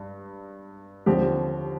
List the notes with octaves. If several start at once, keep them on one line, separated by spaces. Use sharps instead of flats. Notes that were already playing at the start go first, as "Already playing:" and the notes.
Already playing: G2
D#2 D3 F3 C4 G4